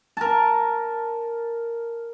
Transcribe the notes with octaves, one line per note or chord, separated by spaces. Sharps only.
A#4 A5